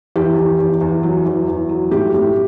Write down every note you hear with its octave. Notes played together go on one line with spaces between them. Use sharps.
E2 G4
E2
E2
E2
F#3
E2
E2
F#3
A2 G4
A2